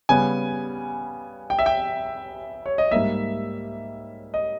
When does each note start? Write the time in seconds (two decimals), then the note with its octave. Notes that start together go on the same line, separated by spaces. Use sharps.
0.09 C#3 G3 B3 G#5
1.50 G5
1.59 E5
1.66 G5
2.66 C#5
2.78 D#5
2.91 G#2 G3 A#3 E5
4.34 D#5